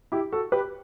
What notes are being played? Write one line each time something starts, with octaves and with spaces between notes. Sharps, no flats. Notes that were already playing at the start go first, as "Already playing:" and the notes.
E4 G4
F#4 A4
G4 B4